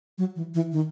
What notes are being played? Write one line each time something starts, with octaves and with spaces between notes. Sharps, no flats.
F#3
E3
E3
D#3